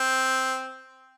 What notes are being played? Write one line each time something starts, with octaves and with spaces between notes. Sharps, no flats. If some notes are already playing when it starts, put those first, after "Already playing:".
Already playing: C4